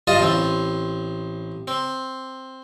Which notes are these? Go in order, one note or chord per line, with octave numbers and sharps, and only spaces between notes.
G2 F4 D#5 A5 D#6
A1 C4
C4